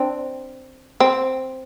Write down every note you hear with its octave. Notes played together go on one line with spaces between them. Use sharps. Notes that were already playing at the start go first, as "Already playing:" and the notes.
Already playing: C4 D4
C4